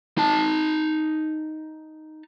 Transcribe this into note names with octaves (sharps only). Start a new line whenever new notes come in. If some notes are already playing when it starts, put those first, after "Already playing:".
D#4 A5